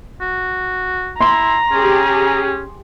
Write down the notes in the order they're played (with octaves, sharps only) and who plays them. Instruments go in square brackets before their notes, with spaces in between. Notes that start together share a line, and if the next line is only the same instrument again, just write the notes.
[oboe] F#4
[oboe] E4 [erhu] A#5 [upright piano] C6
[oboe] C#4 [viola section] G4 G#4